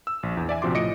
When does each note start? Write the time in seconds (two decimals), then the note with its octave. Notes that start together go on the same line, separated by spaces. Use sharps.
0.07 E6
0.23 A#1
0.37 E2
0.49 D5 E5 G#5
0.62 A#1 C3 F3 F#4 C6 D6
0.74 A2 F3 D#5 D6 C#7 D7